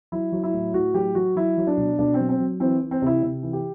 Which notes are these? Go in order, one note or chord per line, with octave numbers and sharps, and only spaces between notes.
F#3 E4
F#3
E4
A2
A2 F#4
F#3 G4
F#3 F#4
F#3 E4
F#3
D4
B2
B2 D4
C4
F#3
C4
F#3
E3 C4
E3
C4
C3 E4
C3
E3
G4